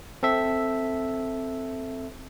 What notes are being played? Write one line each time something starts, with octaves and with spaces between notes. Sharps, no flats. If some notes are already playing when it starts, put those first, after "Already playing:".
C4 A4 E5